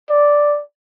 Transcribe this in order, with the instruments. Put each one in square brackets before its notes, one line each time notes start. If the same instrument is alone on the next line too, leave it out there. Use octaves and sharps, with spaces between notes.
[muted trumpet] D5